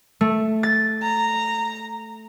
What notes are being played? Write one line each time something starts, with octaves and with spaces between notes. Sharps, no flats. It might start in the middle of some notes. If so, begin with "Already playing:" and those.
A3
A6
A#5